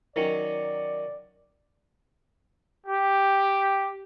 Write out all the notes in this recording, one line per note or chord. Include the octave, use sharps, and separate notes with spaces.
D#3 F#3 C#4 D5
G4